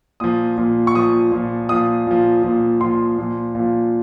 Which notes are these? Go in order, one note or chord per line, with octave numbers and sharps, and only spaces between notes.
A#2 F3 D#6
A#2 F3
C#6
A#2 F3 D#6
A#2 F3
A#2 F3 D#6
A#2 F3
A#2 F3
A#2 F3 C6
A#2 F3
A#2 F3